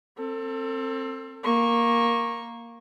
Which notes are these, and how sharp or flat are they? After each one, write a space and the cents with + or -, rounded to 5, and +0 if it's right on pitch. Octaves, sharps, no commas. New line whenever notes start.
C4 +20 A4 +35
A#3 +5 C#6 -20